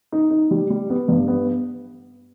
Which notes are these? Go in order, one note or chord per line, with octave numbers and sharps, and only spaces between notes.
D#4
D#4
G3
G3
B3
G2
B3